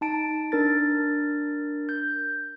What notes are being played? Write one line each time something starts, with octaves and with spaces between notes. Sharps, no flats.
D#4 A5 D7
D4 A#4 A6
G6